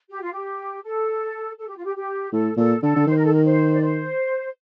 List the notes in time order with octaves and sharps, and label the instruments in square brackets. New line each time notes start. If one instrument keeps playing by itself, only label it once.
[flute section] G4
F4
G4
A4
A4
G4
F4
G4
G4
[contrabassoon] A2 [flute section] A4
[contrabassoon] A#2 [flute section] A4
[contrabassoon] D3 [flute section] A4
[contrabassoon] D3
[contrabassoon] D#3 [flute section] C5
[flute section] A#4
A4
A#4
C5
D5
C5